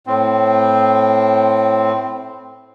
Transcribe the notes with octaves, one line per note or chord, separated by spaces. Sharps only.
A2 C4